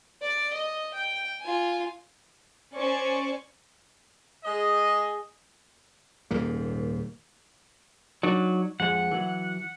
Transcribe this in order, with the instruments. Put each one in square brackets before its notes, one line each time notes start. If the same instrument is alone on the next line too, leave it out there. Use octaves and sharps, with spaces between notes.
[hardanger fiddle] D5
D#5
G5
F4 G#5
[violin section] C#4 C5 D5 G#5 C#6
[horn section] G#3 G#4 D#5
[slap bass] D#1 D#2 G#2 A#3
[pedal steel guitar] F#3 [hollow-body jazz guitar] D4 D#4 D5
[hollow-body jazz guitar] F2 G#3 [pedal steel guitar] F#5
[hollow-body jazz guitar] E3 F#3